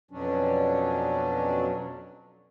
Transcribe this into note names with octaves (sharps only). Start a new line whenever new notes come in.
F2 B2 F#3 C#4 D4